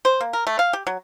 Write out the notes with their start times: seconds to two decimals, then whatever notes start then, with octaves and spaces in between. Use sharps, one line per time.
0.05 C5
0.21 A#3
0.33 A#4
0.47 A3
0.59 F5
0.73 G4
0.87 F#3